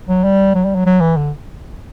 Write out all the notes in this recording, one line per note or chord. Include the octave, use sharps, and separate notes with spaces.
F#3
G3
F#3
G3
F#3
F#3
E3
D3